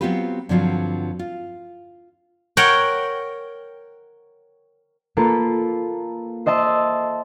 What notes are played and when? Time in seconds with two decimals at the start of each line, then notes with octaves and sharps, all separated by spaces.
0.01 F#3 B3 C4 F4 G4 B4
0.49 G2 D3 F3 F#3 C4 F4
1.19 F4
2.57 A#4 C#5 F#5 G5
5.17 A#3 F4 A4 B4
6.46 C5 D#5 E5 A5 E6